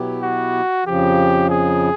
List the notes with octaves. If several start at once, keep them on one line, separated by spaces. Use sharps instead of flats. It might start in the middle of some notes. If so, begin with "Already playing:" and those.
Already playing: B2 F#3 B3 E4 G4
F#4
F2 C#3 F3 G4
G#4